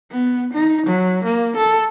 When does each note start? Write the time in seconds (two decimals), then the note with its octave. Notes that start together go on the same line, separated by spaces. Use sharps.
0.11 B3
0.53 D#4
0.87 F#3
1.24 A#3
1.57 A4